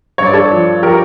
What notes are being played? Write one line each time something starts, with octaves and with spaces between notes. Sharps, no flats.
G2 C#5
D5
A4 C#5
F3
F3 G4 A#4